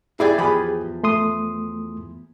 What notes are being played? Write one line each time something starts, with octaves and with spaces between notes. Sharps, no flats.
E4 G4 G#4 D5 G#5
E2 F3 G4 G#4 B5
A3 C6 D#6